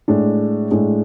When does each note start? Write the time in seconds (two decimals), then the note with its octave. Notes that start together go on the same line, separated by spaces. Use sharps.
0.08 A2 G#3 D4
0.71 A2 G#3 D4